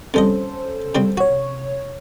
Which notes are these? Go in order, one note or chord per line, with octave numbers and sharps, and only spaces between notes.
F2 G3 C#4 A4 C5 D#5
C#3 G3 C4
C3 F#4 C#5